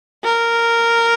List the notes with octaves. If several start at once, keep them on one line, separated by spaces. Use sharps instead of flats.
A#4